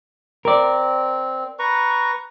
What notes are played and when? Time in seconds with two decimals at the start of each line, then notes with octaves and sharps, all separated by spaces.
0.45 C4 A#4 D5
1.59 B4 A#5 C#6